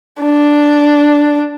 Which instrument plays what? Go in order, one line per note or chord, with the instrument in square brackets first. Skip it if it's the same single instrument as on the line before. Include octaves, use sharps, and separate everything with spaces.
[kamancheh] D4